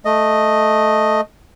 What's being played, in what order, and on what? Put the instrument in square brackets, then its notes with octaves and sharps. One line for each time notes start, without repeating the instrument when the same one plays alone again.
[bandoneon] A3 D#5